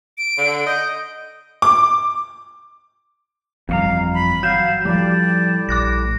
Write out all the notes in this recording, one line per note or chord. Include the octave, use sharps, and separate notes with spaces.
D7
D3
D#5 G6
D6
G1 F2 E3 G3 F#4 F5 A#5
B5
F#3 F5 G6 E7
A2 F3 G3 G4 D5
A#1 D6 F#6 A#6